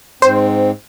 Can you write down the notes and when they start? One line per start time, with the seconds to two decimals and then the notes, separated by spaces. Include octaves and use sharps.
0.22 G#2 C4 C5